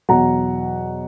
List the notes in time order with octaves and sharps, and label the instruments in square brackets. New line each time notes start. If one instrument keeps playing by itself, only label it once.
[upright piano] E2 B2 F#3 F#5 A#5